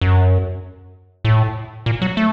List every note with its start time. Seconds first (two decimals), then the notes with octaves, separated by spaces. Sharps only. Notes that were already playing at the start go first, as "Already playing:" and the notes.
0.01 F#2
1.25 A2
1.86 A#2
2.02 F#3
2.17 A3